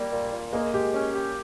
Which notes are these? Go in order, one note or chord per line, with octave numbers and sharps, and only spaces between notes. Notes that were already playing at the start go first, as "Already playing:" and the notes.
Already playing: G3 A#3
A#2
A#2
G#3 A#3
G#3 G4
C#4
G4